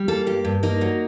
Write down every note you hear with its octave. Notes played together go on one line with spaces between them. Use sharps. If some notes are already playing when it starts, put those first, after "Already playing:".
Already playing: G3
A#3 A4
G2 G4
G2
A#3 D#4
F#3